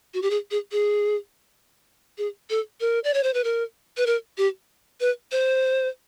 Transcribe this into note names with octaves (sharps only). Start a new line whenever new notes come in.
F#4
G4
G#4
G#4
G#4
G#4
A4
A#4
D5
C#5
C5
B4
A#4
B4
A#4
G4
B4
C5